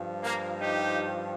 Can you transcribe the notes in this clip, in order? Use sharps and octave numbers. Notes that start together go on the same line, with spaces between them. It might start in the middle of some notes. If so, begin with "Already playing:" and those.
Already playing: G2 F3
A#3
D#4 G4